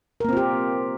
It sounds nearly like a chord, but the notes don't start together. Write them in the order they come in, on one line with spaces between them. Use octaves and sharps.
A#4 A#3 C4 F4 G4